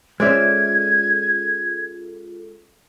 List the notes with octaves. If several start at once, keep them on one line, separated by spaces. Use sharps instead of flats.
G#3 C#4 F4 A4 C5 D5 E5 G#6